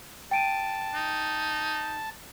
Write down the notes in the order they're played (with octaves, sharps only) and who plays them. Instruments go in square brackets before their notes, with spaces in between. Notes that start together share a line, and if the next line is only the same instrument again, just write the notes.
[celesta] G5 D7 D#7 [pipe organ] A5
[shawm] D#4